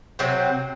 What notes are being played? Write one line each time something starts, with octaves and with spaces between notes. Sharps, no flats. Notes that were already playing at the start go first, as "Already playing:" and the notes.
C3 F#3 C4